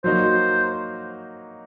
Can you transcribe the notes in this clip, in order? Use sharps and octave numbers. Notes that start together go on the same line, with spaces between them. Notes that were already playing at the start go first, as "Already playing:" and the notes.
F#3 A#3 D#4 F#4 C5